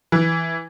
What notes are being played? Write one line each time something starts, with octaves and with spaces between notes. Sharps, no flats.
E3